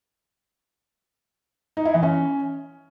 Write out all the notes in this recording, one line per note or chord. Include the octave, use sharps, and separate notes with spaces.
D#4
E4
E3
C#4